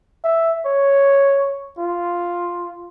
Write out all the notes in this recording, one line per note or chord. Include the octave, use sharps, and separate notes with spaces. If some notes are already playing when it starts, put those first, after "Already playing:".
E5
C#5
F4